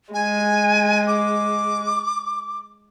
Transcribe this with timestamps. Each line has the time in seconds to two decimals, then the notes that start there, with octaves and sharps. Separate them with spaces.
0.14 G#3 G#5
1.07 D6